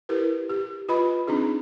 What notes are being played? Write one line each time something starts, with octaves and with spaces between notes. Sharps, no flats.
E4 G4 A#4 B4
G4
F4 B4 D#5 B5
C4 D4 D#4 G#4